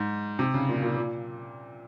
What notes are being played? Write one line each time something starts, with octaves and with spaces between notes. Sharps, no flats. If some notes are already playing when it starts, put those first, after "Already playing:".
Already playing: G#2
C3
C#3
A#2
A#2
A#2